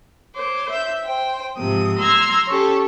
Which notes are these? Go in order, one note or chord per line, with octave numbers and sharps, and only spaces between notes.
C5 C#5 D6
E5 G6
C5 G5
G#2 C3 F3 D#6
A#5 C6 E6 F6 G#6
C#4 G4 A4 C#5